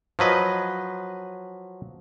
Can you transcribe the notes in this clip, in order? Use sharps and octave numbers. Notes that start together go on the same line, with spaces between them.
F3 F#3 B4 D#5